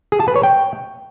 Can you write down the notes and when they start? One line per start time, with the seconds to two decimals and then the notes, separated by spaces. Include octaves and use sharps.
0.12 G#4
0.20 A5
0.28 B4
0.36 C#5
0.43 G5